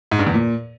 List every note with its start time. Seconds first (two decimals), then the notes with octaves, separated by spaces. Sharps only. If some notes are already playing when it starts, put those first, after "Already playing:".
0.12 G#2
0.19 G2
0.27 E2
0.34 A#2